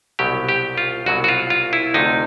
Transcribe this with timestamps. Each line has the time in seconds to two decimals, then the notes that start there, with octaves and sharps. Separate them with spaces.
0.19 C2 B2 F#3 G4
0.49 G4
0.78 F4
1.06 C2 B2 F#3 F#4
1.24 F#4
1.28 F4
1.50 F4
1.73 E4
1.94 D2 C3 F3 A3 D#4